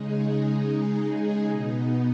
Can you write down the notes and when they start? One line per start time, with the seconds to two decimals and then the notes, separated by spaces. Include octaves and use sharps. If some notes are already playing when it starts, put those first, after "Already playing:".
Already playing: C#3 G#3 D#4 G#4
1.49 B2 B3 D#4